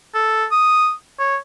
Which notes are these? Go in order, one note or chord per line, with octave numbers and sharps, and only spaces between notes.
A4
D#6
C#5